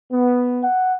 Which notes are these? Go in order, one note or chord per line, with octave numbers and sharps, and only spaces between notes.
B3
F#5